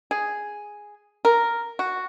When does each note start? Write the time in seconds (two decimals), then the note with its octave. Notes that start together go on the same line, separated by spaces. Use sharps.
0.11 G#4
1.25 A#4
1.79 F#4